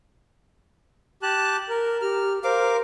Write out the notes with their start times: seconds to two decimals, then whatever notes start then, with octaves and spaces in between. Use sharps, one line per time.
1.23 G4 A5 F#6
1.69 A#4
2.02 G4 F6
2.44 A#4 C5 F5 D6